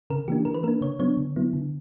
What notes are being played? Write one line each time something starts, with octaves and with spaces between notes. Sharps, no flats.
C#3 A#4
E3 A#3 D4 G4
E3 A#4
B4
A#3 D4 A#4
C#3 C#5
F#3 B3 D4 C#5
D3
F#3 B3 E4
D3